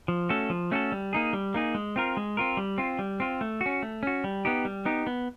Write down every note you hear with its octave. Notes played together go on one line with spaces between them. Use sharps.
F3
A3 C#4 F#4 A4
F3
A3 C#4 F#4 A4
G3
A#3 D#4 G#4
G3
A#3 D#4 G#4
G#3
C4 F4 A#4
G#3
C4 F4 A#4
G3
C4 F4
G3
C4 F4
A3
F#4
C#4
A3
C#4 F#4
G3
B3 D#4 G4
G3
B3 D#4 G4
B3